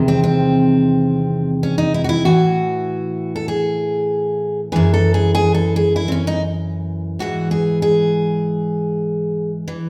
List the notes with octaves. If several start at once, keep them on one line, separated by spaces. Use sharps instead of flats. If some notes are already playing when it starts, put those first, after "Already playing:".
Already playing: E2 C3 D#3
C4
C4
C#4
D#4
E4
F#4
E4
A2 E3 F#4
A4
G#4
F#2 E3 G#4
A4
G#4
G#4
A4
G#4
E4
C4
C#4
D#4
G#2 E3 F#4
G#4
G#4
E3